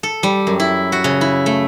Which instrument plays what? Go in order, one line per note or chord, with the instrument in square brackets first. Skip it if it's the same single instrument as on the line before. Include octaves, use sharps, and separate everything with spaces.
[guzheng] A4
G3
F#2
E4
F#4
C#3
E4
A3